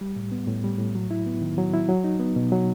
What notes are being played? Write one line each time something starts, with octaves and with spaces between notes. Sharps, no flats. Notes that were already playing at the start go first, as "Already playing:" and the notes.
G3
A2
B3
A2
G3
A2
F#3
E4
B3
D#3
F#3
E4
F#3
D#4
B3
B2
F#3